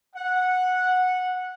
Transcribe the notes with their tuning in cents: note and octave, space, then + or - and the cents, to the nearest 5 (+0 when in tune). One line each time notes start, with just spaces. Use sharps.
F#5 -10